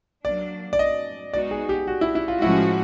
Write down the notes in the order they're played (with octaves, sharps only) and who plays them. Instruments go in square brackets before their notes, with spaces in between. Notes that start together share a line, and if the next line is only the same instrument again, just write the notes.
[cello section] F#3 A#3 D4 [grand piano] D5
[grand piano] D5
D#5
[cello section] G#3 B3 D#4 F#4 [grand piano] D5
[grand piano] G#4
G4
F#4
E4
E4
F4
[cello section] A2 F3 G#3 C#4 F#4 [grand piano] E4